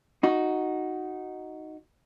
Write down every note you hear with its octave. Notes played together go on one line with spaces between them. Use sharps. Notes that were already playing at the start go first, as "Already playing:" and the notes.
D#4 F#4